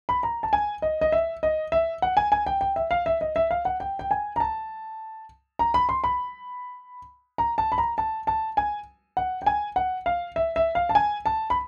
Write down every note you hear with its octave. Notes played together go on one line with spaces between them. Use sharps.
B5
A#5
A5
G#5
D#5
D#5
E5
D#5
E5
F#5
G#5
G#5
G5
G5
E5
F5
E5
D#5
E5
F5
F#5
G5
G5
G#5
A#5
A5
A#5
B5
C6
B5
A#5
A5
B5
A#5
A5
A5
G#5
F#5
G5
G#5
F#5
F5
E5
E5
F5
A5
G#5
A5
B5